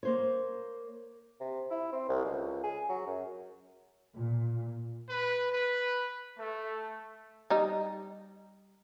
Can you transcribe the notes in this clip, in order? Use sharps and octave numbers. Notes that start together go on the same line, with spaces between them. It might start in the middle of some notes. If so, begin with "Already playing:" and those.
A#3 C5 C#5
C3
E4
C4
C2
C#2
G#4
F#3
F#2
A#2
B4
B4
A3
G3 D#4